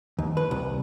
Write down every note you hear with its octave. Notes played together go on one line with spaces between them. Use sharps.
D#2
B4
C2